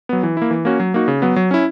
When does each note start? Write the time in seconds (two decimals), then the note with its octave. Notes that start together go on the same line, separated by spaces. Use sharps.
0.09 F#3 B3
0.23 E3
0.37 A#3 E4
0.51 E3
0.65 A#3 C#4 F#4
0.80 F#3
0.94 A#3 D#4 F#4
1.08 C#3
1.22 F#3 B3
1.36 F#3
1.51 C#4 E4